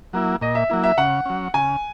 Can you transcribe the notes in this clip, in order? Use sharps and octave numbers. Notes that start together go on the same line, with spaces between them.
F#3 A#3 E4
A#2 D#5
E5
F#3 A#3 E4
E5
C#3 F#5
F#3 C#4
C#3 G#5